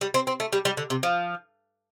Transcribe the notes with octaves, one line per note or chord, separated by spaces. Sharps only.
G3
C4
C4
A3
G3
G3
D3
C3
F3